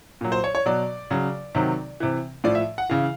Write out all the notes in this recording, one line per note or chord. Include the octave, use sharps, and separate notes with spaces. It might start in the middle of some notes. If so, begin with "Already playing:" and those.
A#2 F#3
C5
C#5
C#5
B2 F#3 D5
C#3 F#3
C3 D#3 F#3
C3 E3
A2 F3 D5
E5
F#5
C#3 E3 F5